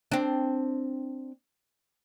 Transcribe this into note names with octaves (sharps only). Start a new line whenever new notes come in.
C4 D4